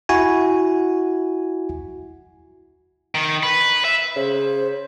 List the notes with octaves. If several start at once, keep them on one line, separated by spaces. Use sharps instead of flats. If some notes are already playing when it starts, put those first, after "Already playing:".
E4 F#4 G#5
D#3
B4
E5
C#3 C5